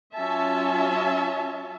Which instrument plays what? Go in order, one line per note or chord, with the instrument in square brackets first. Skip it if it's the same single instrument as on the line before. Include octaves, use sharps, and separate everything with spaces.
[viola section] F#3 C#4 F4 E5 G#5 A5